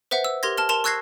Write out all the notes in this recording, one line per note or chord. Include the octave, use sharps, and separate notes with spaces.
B4 C5 E5 F#5
E6
G4 A#4 C6 G#6 A#6
A5 F6 G7
A#4 A5 C6 E7 F7
C#6 E6 F#6 G#6 A#6 C7